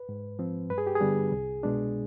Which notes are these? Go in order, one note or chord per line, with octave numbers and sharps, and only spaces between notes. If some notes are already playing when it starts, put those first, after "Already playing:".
Already playing: B4
G#2
F3 C4
G2 B4
G#4
G4
G#4
D3 G3 B3 D4
C2
B2 G#3 D4